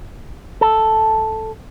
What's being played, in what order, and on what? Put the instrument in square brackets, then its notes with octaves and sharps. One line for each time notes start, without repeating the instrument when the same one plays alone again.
[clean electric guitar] A4